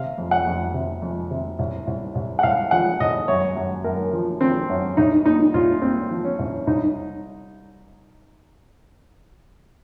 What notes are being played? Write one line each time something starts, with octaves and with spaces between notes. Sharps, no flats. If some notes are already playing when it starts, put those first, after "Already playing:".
Already playing: C3 F5
F2
F#5
F2
C3
F2
C3
C2
C2
C2
F#5
C2 F5
F3 F#5
C2 D#5
F#2 C#5
F#2
F#2 A#4
F3
F3 C4
F#2 C#4
C2 D#4
A#2 D#4
C2 F4
A#2 C4
F3
C#4
C2
C2 D#4